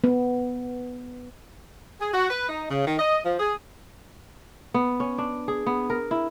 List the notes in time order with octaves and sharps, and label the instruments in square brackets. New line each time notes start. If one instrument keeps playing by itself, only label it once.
[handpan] B3
[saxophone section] G#4
F#4
B4
D#4
C#3
D#3
D#5
F3
G#4
[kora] B3
C#4
D4
G#4
B3
A#4
E4